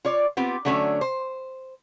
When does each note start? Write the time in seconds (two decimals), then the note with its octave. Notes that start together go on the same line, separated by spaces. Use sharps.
0.05 F4 C#5 D5
0.37 B3 C4 F4 G4
0.65 D3 F#3 A3 C#4 D4
1.01 C5